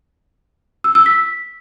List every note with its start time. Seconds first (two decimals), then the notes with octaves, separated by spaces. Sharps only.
0.84 E6
0.95 E6
1.06 B6